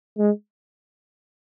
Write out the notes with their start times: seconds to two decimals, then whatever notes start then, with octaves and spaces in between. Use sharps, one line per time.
0.18 G#3